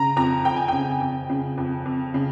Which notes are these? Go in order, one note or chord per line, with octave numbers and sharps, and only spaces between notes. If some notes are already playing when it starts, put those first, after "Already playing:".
Already playing: C#3 A#5
F2 A#5
F2 G5
G#5
C#3 G5
F2
C#3
F2
F2
C#3